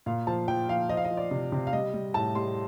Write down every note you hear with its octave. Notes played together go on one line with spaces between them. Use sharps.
A#2 F5
F3 A5
F3 G5
F3 F5
F3 D#5
F5
D#5
F3
D5
C3
C3
F5
G3 D#5
G3
A2 A5
G3 C6